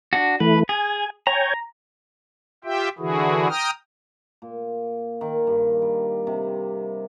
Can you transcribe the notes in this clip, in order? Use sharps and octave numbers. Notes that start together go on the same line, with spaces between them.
D4 F#4
E3 A3 B4
G#4 G#5
C#5 G5 G#5 A#5
F4 G4 E5 G5
D3 E3 E4 F#4 G#4
G5 A#5 D#6 F6
A#2
D#3
G2
G3
C3